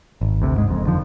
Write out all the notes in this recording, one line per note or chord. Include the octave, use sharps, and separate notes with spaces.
G#1
D2 C3
G#2 G#3
F#1 F2
F2 D3 D#3 F3